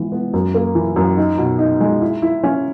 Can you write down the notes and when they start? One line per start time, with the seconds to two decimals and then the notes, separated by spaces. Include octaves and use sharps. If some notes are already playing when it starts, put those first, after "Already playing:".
Already playing: G#2 E3 B3
0.12 B3
0.34 F#2
0.54 A#3
0.75 E3
0.96 F#2
1.17 D#4
1.38 B2
1.59 D#4
1.81 G#3
2.02 E4
2.22 E4
2.43 C#4